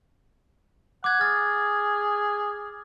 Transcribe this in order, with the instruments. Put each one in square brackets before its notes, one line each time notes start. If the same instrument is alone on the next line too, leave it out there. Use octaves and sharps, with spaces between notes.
[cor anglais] F#5 [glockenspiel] D6 G#6
[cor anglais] G#4 [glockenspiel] F6 A6